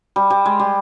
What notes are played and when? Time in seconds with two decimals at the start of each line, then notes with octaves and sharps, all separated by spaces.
0.16 G3
0.30 G3
0.46 G#3
0.60 G3